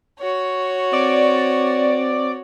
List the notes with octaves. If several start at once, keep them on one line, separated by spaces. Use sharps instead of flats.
F#4 C#5
C4 D5